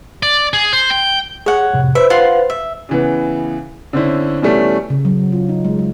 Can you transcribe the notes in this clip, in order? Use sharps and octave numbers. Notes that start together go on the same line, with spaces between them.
D5
G#4
C5
G5
G#4 C#5 F#5
F2 A2 C3
B4 C5 E5
F4 F#5 C6
E5
C#3 E3 B3
D3 C4 C#4 E4
B2 E3 G3 A3 C#4
C#3
F#3
F4
D#4
G#3
G#3